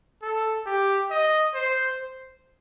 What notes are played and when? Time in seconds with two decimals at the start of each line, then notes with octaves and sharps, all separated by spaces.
0.22 A4
0.66 G4
1.11 D#5
1.54 C5